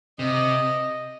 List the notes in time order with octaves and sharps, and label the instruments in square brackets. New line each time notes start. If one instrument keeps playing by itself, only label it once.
[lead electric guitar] C3 [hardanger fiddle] D#5